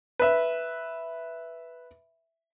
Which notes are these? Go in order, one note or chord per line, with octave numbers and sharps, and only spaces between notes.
B4 E5